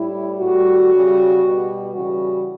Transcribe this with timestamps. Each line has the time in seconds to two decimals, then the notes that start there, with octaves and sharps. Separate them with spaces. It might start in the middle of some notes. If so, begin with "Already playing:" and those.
Already playing: A2 G3 E4
0.39 A2 G3 F#4
0.91 C#3 G3
1.42 B2 G3
1.94 C#3 E3 G3 F#4